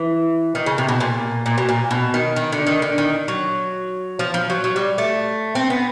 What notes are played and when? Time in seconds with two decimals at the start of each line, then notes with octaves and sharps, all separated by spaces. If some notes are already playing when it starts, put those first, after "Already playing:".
Already playing: E3
0.55 D#3
0.66 C#3
0.78 C3
0.88 B2
1.00 A#2
1.46 A#2
1.58 B2
1.69 A#2
1.91 B2
2.14 D#3
2.36 D#3
2.52 D3
2.67 D#3
2.82 D3
2.98 D#3
3.28 F#3
4.19 F3
4.34 F3
4.50 F#3
4.64 F#3
4.76 G3
4.98 A3
5.55 C4
5.70 B3